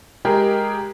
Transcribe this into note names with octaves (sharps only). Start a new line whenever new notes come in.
G#3 G4 G#4 A#4